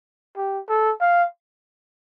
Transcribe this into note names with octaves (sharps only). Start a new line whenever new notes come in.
G4
A4
F5